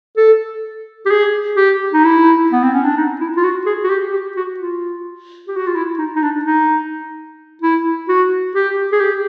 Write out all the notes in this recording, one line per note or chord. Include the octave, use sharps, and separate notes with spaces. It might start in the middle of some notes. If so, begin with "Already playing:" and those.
A4
G4
G#4
G4
D#4
E4
B3
C4
C#4
D4
D#4
E4
F4
F#4
G#4
F#4
G4
G4
F#4
F4
G4
F#4
F4
E4
D#4
D#4
D4
D#4
E4
F#4
G4
G#4
G4